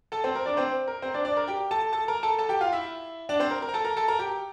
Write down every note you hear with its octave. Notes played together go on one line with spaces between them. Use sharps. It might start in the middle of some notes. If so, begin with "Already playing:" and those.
A4 A5
C4 C5
A#4
D4 D5
C4 C5
A#4
C4 C5
D4 D5
D4 D5
A#4
G4 G5
A4 A5
A4 A5
A#4 A#5
A4 A5
A4 A5
G4 G5
F4 F5
E4 E5
D4 D5
C4 C5
A#4
A#4
A#5
A4 A5
A#4 A#5
A4 A5
A#4 A#5
G4 G5